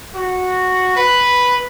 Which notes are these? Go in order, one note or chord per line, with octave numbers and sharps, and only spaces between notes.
F#4
B4